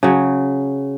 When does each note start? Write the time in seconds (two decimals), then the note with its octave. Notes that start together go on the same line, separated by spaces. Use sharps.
0.03 C#3 F#3